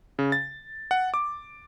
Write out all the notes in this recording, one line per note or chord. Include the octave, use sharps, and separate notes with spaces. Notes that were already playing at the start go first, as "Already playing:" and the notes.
C#3
A6
F#5
D6